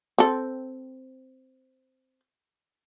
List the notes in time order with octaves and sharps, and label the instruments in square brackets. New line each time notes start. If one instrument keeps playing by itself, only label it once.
[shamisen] C4 A4